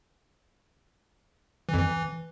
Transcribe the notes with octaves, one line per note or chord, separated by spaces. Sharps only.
E3
F2
E3